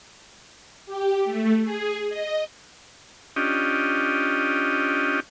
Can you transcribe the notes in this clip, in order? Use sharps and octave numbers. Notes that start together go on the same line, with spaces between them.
G4
A3
G#4
D#5
C#4 D4 F4 G4 D#5